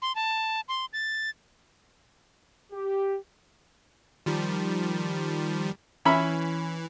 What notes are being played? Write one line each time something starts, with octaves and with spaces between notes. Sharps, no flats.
C6
A5
C6
A6
G4
D#3 F3 G3
E3 C#4 E5 B5